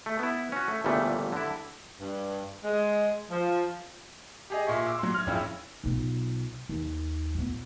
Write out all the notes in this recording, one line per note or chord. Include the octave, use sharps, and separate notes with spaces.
A3
B3 E4
C#4 F#4
A3
G1 A#2 C#3 E3 G3 A3
D3 E4
G2
G#3
F3
G4 G#4 D#5
A#2 G#4 E5 C#6
D6 E6
F#3 C6
F6 G#6
F#1 F2 C#4 E4 F4 E6
B1 F4
D#2
A#2 B3